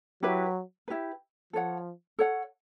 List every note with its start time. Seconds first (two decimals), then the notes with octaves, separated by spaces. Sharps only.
0.22 F#3 E4 G4 B4
0.88 E4 G4 B4
1.53 F3 A4 C#5 F#5
2.19 A4 C#5 F#5